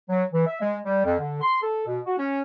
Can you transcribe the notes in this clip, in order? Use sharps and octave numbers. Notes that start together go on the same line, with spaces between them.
F#3
E3
E5
G#3
G3
F2
D3
C6
A4
B2
F#4
C#4